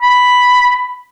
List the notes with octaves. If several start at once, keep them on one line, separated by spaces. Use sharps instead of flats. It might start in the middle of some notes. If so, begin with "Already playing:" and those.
B5